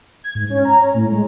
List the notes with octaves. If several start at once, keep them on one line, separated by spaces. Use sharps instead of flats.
G#6
G#2
C#4
A#5
C#5
A2
G#3